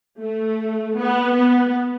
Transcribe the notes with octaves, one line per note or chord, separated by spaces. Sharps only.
A3
B3
B3